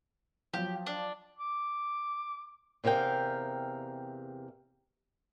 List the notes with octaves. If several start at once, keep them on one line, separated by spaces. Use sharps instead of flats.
F3 F#3 G4
D4
D6
E2 C3 A#4 F5 G5